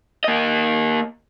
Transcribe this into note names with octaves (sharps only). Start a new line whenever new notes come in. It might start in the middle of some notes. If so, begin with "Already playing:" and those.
A#3 D#5